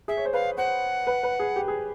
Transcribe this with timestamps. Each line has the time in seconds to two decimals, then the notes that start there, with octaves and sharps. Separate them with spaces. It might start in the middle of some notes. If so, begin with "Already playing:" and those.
0.08 G#4 E5
0.17 C#5
0.25 C5
0.33 B4 F5
0.58 C5 F#5
1.07 B4
1.23 B4
1.40 G#4
1.56 G4
1.68 G#4